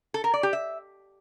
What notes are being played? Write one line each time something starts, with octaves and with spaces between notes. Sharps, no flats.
A4
A#4
D5
G4
E5